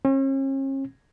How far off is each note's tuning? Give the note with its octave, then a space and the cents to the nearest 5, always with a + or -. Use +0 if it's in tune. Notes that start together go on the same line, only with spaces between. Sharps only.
C#4 -45